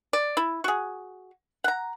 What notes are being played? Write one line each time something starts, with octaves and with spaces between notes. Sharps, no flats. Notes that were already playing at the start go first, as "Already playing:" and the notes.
D5
E4
F#4 G#4
F#5 A#5